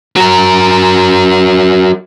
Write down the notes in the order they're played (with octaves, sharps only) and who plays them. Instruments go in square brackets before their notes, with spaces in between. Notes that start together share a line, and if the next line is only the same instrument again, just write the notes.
[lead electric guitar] F#3 A#4